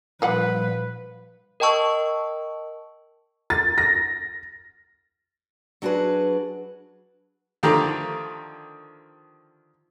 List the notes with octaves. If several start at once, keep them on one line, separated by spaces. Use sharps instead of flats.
A#2 F3 G3 F4 B4 F5 F#5
A#4 D#5 G5 A5 C#6 E6
A6
A#6
F#3 D4 F#4 G#4 B4
D3 D#3 F3 A3 G4 A#5